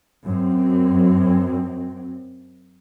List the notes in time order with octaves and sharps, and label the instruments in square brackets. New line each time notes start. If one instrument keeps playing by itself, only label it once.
[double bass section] F#2 C4